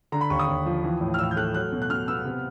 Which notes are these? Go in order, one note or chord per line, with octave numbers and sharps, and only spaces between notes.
D3 A#5
B5
D#2 C#6
D#6
D#2
F3
E3
A2
F6
A2 E6
G6
A3 F#6
F#3 F#6
B2
F#6
B2 F6
B3 E6
C3